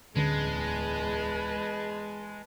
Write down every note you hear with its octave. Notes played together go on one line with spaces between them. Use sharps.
D1 E2 D3 G#3 C#4 G#4 B4 A5